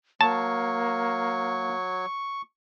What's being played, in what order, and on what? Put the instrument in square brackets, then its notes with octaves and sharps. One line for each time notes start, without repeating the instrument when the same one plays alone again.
[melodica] F#3 [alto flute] A#3 [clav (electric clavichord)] A5 [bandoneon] C#6